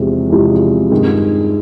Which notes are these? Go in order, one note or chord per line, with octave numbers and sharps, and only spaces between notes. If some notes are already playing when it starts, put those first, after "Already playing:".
Already playing: E2 C3 F3 G#3
E2 C3 F3 G#3
G2 D#3 G#3